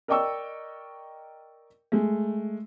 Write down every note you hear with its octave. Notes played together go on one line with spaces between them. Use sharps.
A#4 D5 D#5 G5 C#6 E6
G#3 A3